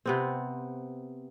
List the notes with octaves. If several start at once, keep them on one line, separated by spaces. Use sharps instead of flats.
C3 B3 C4